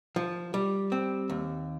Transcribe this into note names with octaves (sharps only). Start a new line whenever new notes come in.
F3
G3
C4
D#2